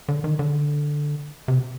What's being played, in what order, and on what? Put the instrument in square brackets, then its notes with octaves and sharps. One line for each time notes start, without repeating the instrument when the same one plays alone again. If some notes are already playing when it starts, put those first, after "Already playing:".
[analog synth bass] D3
D#3
D3
C3